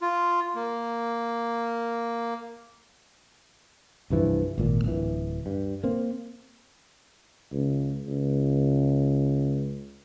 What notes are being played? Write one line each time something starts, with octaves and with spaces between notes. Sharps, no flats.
F4
A#3
C2 G2 E3 F3
G#1 A#2
D1 E3
G2
A#3 C4
C#2
C#2